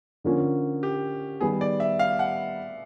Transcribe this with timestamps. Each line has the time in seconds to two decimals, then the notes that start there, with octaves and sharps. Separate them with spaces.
0.24 D3 F3 A#3 C#4
0.83 G4
1.40 D#3 G3 B3 G#4
1.61 D5
1.80 E5
1.99 F5
2.19 F#5